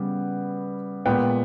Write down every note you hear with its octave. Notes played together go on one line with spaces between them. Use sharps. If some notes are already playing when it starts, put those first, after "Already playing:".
Already playing: C#3 G3 B3
A#2 G#3 B3 G5